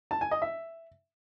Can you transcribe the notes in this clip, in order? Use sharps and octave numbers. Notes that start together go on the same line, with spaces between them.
A5
G#5
D#5
E5